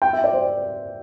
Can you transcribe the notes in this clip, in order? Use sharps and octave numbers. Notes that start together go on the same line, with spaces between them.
G5
E5
D5
C5